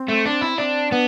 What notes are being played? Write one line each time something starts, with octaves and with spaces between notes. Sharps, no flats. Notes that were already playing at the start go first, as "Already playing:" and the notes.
Already playing: C4
A3
D4
E4
C4 D4
B3 D4